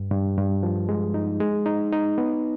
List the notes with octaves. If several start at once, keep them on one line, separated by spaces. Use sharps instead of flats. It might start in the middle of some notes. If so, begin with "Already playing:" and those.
Already playing: G2
G2
G2
F3
G#3
D#4
G#3
D#4
D#4
B3